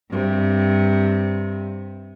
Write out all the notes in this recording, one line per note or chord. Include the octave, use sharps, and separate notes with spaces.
G2 C3